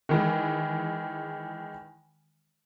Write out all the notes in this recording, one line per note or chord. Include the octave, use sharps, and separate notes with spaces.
D#3 E3 G#3